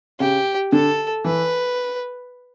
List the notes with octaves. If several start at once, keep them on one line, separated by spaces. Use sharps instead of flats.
C#3 G4
D3 A4
E3 B4